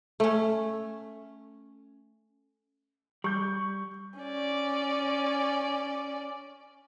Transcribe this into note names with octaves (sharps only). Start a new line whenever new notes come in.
A3 C#4
G3 C#6 G6
C#4 D5